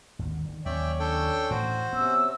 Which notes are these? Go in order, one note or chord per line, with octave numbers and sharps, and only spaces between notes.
G#1 D#2 D3
D3 D#3
D#2 F#3 C#4 C#5 D5 E5 G5
D4 A4 G5
A2 E3 F#4 C5
C3 B3 C#4 E6